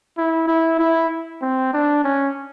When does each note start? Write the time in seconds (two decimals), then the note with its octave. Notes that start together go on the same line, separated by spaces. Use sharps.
0.17 E4
0.48 E4
0.79 E4
1.41 C4
1.73 D4
2.04 C#4